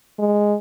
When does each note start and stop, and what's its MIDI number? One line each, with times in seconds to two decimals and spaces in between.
0.19 0.55 56